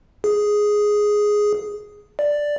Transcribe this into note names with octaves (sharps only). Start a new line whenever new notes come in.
G#4
D5